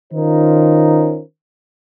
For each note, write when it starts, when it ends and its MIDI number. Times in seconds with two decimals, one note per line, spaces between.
0.13 1.21 51
0.13 1.21 61
0.13 1.21 63
0.13 1.21 65
0.13 1.21 70
0.13 1.21 72